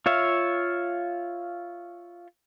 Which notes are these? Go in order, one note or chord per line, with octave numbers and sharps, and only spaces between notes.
F4 C#5 E5 F5